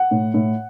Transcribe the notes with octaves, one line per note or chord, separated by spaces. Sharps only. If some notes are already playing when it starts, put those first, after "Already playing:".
Already playing: F#5
A2
A2